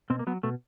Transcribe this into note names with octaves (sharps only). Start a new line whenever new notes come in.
B2 C4
A#3
F#3 B3
B2 A3